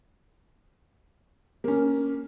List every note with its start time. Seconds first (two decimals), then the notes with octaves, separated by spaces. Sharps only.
1.64 A#3 C#4